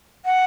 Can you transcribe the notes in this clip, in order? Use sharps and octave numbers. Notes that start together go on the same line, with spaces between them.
F#5